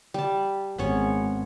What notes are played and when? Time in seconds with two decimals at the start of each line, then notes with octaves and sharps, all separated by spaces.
0.14 G3 A5
0.78 G#1 B3 C#4 C#5